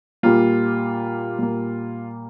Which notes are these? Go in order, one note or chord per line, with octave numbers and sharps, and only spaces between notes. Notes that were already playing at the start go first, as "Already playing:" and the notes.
A#2 G3 A#3 F4
A#2 G3 A#3